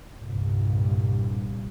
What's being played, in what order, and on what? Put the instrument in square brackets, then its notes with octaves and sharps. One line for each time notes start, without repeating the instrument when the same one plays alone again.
[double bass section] C2 G2 A#2